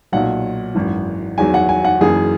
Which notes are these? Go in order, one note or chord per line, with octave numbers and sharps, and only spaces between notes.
B1 A#2 F#3 F#5
G#1 F#2 E3
E2 D#3 F#3 G#5
F#5
G#5
F#5
F#1 F#2 E3 G#4